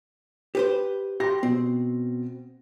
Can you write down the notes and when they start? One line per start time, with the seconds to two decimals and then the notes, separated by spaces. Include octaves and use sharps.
0.55 G4 B4 C5
1.20 G4 C6 A#6
1.43 B2 C4